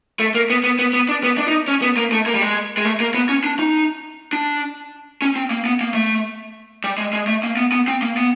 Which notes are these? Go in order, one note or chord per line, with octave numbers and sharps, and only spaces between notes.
A3
A#3
B3
B3
B3
B3
D4
B3
D4
D#4
C#4
B3
A#3
A3
A#3
G3
G#3
G#3
A3
A#3
B3
C#4
D4
D#4
D4
C#4
C4
A#3
B3
A#3
A3
G3
G#3
G#3
A3
A#3
B3
B3
C4
A#3
B3